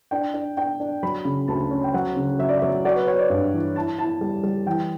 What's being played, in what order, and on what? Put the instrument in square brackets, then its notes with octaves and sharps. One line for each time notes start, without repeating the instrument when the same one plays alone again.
[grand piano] D4 [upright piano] G5
[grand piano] D4
[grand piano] D4 [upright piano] G5
[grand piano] D4
[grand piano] F#3 [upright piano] B5
[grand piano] C#3
[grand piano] D2 [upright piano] A5
[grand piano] C#4
[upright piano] G5
[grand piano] F#3 [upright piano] F#5
[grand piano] C#3
[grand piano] F#3 [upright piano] E5
[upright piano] D5
E5
[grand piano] F#3
[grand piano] F#4 [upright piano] D5
[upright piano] B4
[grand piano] F#4 [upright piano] C#5
[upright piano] D5
[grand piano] G2
E3
[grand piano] E4 [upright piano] A5
[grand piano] E4 [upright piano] A5
[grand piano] G3
G3
[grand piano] E3 [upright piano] G5